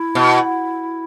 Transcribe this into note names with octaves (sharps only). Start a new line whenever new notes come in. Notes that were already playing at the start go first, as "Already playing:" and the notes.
Already playing: E4
B2